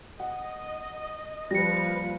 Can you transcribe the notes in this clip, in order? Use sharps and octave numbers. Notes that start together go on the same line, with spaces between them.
D#5 F#5
F3 G3 A#3 B4 A#6 C#7